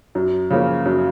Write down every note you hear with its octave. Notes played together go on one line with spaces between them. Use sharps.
F#2
C#3 F3 A#3 C#4
F#2